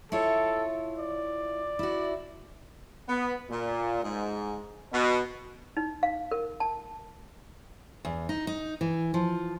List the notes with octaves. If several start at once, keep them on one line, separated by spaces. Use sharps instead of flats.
E4 F4 A4 C#5
D5
E4 F#4
B3
A#2
G#2
B2
D#4
F5
A#4
A5
E2
D#4
D#4
E3
F3